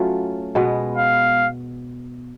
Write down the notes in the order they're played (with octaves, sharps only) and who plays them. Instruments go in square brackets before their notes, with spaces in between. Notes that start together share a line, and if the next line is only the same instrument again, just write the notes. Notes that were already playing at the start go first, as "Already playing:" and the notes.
Already playing: [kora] F#3 A3 C#4 F4
B2 G#3 B3
[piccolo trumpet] F5